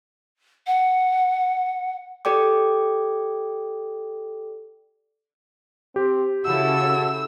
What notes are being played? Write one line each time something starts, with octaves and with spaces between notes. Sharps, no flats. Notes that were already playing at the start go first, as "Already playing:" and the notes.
F#5
G4 A4 D5 G5 D6
C4 G4
C#3 E4 F#4 A4 E6